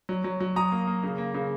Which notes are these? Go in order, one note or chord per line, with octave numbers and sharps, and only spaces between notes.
F#3
F#3
F#3
F#3 A#5 D#6
A#3
A#3
C#3
A#3
C#3